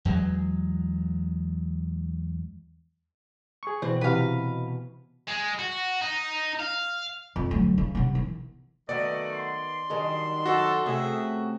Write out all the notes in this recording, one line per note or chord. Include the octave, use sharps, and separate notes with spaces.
E2 F#3 G#3
G#4 C#6
B2 E3 C4
C3 E3 F#4 B4 F5
G#3
F#4
D#4
F5
F2
D2 F#3
C#3
C3 B3
E3
D#3 F#3 A3 B3 F#4 D5 D#5
C6
D#3 F#3 G3 D4 D#4 G#4
F#2 F#4 A4
C3 A3 C#4 G#4 E5